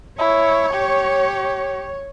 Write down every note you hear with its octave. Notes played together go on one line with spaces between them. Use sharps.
E4 C#5
G4